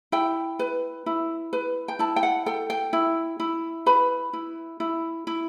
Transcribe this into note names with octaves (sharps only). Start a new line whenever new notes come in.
E4 G5
B4
E4
B4
G5
E4 A5
G5
F#5
A4 G5
G5
E4
E4
B4 B5
E4
E4
E4